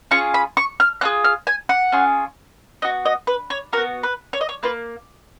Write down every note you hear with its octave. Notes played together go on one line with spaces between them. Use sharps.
C#4 F4 G#4 C#6
B5
C#6
F6
C#4 F4 G#4 F#6
F6
G#5
F#5
C#4 F4 G#4
B3 F#4 D#5
D#5
B4
C#5
B3 F#4 A#4
B4
C#5
D#5
C#5
A#3 F4 B4